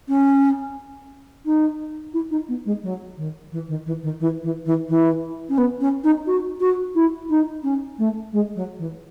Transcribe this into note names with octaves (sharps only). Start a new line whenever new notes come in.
C#4
D#4
E4
D#4
B3
G#3
F#3
D#3
E3
D#3
E3
D#3
E3
E3
E3
E3
C#4
B3
C#4
D#4
F#4
F#4
E4
D#4
C#4
A3
G#3
F#3
E3